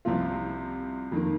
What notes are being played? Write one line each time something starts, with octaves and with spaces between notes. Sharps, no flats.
C2 C3 F3 C4 F4
F2 D#3 A#3